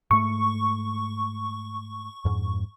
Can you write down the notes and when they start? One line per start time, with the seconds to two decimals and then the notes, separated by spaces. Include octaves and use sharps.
0.11 G#2 A3 C#6
2.25 F2 G#2